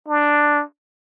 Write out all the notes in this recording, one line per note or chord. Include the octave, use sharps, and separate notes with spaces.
D4